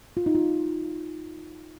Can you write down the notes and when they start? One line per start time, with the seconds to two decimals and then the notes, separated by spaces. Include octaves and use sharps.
0.17 F4
0.26 D#4
0.35 F4